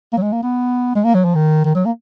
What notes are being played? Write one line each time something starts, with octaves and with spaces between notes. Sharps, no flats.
A#3
F#3
G#3
A#3
B3
G#3
A#3
F#3
F3
D#3
D#3
F#3
A#3